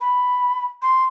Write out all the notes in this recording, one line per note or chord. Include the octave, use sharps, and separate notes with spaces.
B5
C6